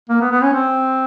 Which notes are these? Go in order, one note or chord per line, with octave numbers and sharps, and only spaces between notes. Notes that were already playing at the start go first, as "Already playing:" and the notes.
A#3
B3
B3
C#4
C4